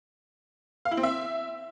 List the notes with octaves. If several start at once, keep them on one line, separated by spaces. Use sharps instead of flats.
F5
E4
C4
E5